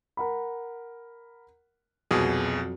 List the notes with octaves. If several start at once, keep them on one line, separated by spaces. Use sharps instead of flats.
A#4 F#5 B5
C2 F2 B2 F#3 G#4